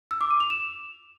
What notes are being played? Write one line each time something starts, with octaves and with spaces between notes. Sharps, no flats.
E6
D6
D#7
F7
E7